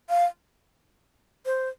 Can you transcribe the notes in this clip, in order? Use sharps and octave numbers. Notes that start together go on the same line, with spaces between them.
F5
C5